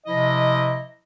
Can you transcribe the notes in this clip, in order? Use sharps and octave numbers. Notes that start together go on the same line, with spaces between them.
C3 F3 E4 D#5